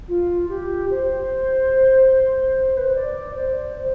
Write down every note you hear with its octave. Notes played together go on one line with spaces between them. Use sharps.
F4
G4
C5
B4
C5
D5
C5
C5